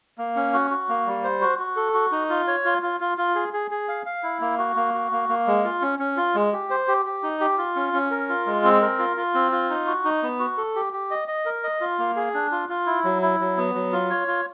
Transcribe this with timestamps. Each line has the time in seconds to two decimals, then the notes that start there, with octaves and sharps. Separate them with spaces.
0.18 A#3
0.36 C#4
0.53 F#4
0.71 F#4
0.89 A#3
1.06 G3
1.24 C5
1.41 F#4
1.59 F#4
1.76 A4
1.94 F#4
2.12 D#4
2.29 F4
2.47 C#5
2.65 F4
2.82 F4
3.00 F4
3.18 F4
3.35 G#4
3.53 G#4
3.71 G#4
3.88 F5
4.06 F5
4.23 E4
4.41 A#3
4.59 F#4
4.76 A#3
4.94 F#4
5.12 A#3
5.29 A#3
5.47 G#3
5.64 F4
5.82 C#4
5.99 C#4
6.17 F4
6.35 G#3
6.53 G4
6.70 C5
6.88 G4
7.06 G4
7.23 D#4
7.40 G4
7.58 F4
7.76 C#4
7.93 C#4
8.11 A#4
8.29 F4
8.46 G#3
8.64 C4
8.81 A#4
8.99 F4
9.17 F4
9.34 C4
9.52 F4
9.70 D#4
9.87 F#4
10.05 D#4
10.23 B3
10.39 F#4
10.58 A4
10.75 G4
10.93 G4
11.11 D#5
11.28 D#5
11.46 A#4
11.64 D#5
11.81 F4
11.99 A#3
12.16 G#4
12.34 D4
12.52 F4
12.69 F4
12.86 E4
13.04 F#3
13.22 E4
13.40 F#3
13.57 B3
13.75 F#3
13.92 F4
14.10 C#5
14.28 F4